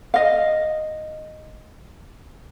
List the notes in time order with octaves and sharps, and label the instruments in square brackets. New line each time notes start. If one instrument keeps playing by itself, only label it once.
[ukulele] D#5 F5